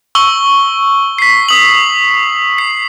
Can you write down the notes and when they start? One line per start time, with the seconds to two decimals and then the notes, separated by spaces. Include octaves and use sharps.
0.15 C#6 E6 G7
1.19 B6 C7
1.49 D#6 F#7
2.58 C7